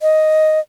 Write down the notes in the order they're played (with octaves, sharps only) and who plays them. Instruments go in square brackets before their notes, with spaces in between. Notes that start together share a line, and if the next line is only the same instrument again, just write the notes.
[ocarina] D#5